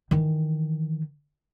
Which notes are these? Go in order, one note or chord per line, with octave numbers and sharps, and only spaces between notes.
D#3 E3